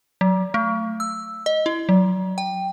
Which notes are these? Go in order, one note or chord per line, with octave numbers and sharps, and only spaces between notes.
F#3
A3
E6
D#5
E4
F#3
G5